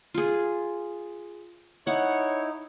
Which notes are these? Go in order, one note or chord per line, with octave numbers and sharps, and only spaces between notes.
F4 G#4
D#4 E4 C#5 F#5